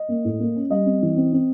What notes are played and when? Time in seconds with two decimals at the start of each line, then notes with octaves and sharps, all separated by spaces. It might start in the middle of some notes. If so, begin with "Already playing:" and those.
Already playing: D#5
0.08 A#3
0.24 A2
0.40 A#3
0.56 C#4
0.70 G3 D#5
0.86 C4
1.02 E3
1.17 C4
1.33 C4